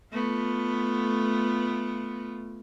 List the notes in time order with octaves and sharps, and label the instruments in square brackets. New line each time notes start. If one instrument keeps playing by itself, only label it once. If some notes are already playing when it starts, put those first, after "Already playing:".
[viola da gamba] A3 B3 F4